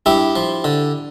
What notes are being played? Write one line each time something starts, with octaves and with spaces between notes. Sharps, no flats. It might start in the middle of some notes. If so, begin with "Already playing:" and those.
G2 E4 G4
F3
D3